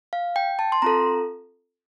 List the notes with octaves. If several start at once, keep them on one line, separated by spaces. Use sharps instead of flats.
F5
G5
A5
C6
C4 F4 A4 A#5